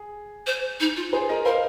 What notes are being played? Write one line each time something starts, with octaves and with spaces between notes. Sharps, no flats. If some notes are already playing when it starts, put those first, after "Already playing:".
Already playing: G#4
C5
D#4
F4
F4 G#4 C5
G#4 A#4 D#5
A#4 C5 F5